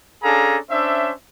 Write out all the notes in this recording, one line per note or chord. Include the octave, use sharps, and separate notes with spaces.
C#4 D4 G#4 A4 F5 A#5
C#4 D4 C5 E5